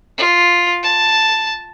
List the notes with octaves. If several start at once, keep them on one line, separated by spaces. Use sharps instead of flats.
F4
A5